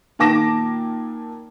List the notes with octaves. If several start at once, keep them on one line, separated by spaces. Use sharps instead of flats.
A#2 D#3 A5 D6 A#6 E7